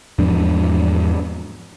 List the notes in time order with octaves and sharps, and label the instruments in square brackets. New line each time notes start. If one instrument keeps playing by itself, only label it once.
[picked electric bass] E2 G#2 F3 D4